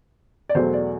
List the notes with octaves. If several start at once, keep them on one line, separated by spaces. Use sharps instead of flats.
D5
E2 B2 F#3 A3 C5
D5